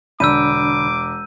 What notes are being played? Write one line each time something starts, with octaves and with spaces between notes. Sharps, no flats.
E1 D3 D4 B5 D6 E6 G6 D#7